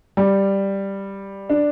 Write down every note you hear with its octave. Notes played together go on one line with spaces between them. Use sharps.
G3
D4